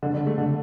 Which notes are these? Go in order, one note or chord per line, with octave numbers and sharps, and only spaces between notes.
D3
D3
A3
D3